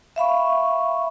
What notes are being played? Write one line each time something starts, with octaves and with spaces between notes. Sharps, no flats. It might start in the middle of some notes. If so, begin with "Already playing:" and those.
E5 F5 B5 C#6